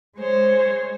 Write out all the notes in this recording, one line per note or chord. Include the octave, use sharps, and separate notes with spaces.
G#3 C5 C#5